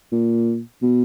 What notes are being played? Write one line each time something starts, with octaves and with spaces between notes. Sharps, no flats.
A#2
B2